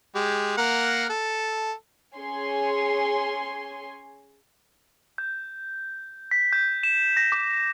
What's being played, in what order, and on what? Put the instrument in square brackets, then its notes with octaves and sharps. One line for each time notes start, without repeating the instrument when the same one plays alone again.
[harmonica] G#3 G4
A#3 A#4 F#5
A4
[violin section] C#4 G#4 C#5 G#5 C6
[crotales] G6
B6
G6
E7
A#6
D6